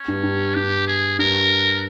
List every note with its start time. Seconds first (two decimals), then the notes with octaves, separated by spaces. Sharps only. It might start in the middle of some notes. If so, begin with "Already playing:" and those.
Already playing: C#4
0.08 G2
0.23 G2
0.55 G2 G4
0.87 G#4
1.19 G2 A#4